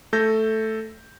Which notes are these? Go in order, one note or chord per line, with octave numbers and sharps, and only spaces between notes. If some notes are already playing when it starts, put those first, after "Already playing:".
A3 A4 G6 A#6